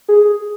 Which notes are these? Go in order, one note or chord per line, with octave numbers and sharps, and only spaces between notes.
G#4